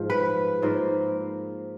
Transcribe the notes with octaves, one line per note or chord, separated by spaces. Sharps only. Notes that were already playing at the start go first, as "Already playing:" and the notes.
Already playing: G#2 F3
B4
G#2 F3 A#3